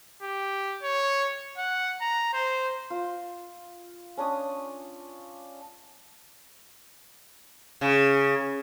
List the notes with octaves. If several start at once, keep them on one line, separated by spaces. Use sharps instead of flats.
G4
C#5
F#5
A#5
C5
F4
C#4 D4 C#5 D#6
C#3